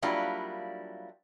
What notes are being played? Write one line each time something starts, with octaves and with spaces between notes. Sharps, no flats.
F#3 G3 A#3 D4 E4 F4